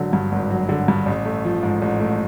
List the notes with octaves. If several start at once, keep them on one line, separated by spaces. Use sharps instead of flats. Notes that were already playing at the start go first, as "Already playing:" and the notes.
Already playing: G#1 D3 F#3
G2
G#1
F#3
D3
G2
A1
A3
F3
G#2
A1
A3